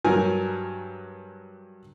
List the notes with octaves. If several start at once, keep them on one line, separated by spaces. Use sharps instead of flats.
G2 F#3 A#4 G#5